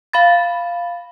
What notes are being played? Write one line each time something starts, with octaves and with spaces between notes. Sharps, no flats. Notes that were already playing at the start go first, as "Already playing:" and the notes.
F5 B5 A6